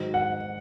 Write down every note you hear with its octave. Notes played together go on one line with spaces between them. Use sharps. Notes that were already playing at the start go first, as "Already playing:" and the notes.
Already playing: G#2 D#3 F#3
F#5